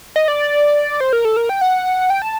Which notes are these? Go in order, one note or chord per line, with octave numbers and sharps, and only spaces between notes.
D#5
D5
C5
A#4
A4
A#4
G5
F#5
G5
A5